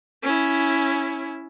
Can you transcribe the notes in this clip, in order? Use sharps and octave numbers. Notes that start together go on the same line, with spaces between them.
C#4 E4